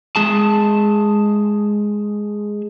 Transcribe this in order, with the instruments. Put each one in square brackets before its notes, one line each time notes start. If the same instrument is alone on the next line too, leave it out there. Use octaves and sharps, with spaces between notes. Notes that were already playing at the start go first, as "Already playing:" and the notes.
[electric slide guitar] G#3 G#4 A5